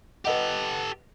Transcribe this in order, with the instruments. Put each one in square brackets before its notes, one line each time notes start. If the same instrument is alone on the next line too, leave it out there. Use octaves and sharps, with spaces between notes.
[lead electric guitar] G4 A4 [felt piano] B4 D#5 F#5